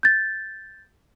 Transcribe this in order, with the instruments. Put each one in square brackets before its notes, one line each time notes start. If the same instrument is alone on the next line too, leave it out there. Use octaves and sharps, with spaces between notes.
[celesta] G6 A6